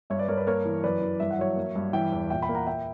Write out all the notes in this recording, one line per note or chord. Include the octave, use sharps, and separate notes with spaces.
G2 C#5 E5
B4 D5
G2 A#4 C#5
B4
A#3 A#4 C#5
E3
F#2 B4 D5
E3
G2 E5
F#5
F#3 C#5 E5
A#3
G2
E3 E5 G5
E2
A#2 E5 G5
G5 B5
A#3
F#5 A#5
A#3 E5 G5